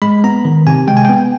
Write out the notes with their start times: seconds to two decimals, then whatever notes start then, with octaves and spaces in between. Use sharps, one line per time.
0.02 G#3 B5
0.24 B3 A#5
0.45 D#3
0.67 C3 G#5
0.87 G#3 G5
0.97 G#5
1.05 G5
1.09 B3